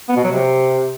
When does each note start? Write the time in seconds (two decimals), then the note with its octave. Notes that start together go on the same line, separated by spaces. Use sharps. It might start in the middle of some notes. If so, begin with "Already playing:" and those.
0.09 B3
0.16 B2
0.24 F#3
0.31 C3